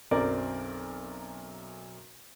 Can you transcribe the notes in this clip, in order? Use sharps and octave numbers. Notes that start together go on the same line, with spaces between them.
B1 F#2 C4 A#4 D5